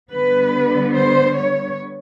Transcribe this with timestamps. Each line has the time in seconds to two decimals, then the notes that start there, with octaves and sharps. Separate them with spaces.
0.11 D3 G3 B3 B4
0.94 C5
1.36 C#5